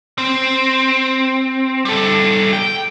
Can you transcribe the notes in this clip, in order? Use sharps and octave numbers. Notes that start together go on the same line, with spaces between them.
C4
G3 A4
G5